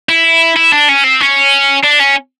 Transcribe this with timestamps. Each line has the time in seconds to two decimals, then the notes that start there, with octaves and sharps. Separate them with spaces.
0.09 E4
0.56 E4
0.72 D4
0.89 C#4
1.04 C4
1.21 C#4
1.84 D4
2.00 C#4